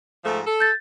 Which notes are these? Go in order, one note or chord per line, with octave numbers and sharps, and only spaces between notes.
G#2 F3 A3
A4
G6 A6